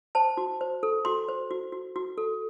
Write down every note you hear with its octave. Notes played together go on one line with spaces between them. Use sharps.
C5 A5
F#4
C5
A4
F#4 C6
C5
F#4
F#4
F#4
A4